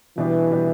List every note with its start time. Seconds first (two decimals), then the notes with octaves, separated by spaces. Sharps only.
0.17 B2 E3 G3 D4 G4
0.51 B2 G3 D4 G4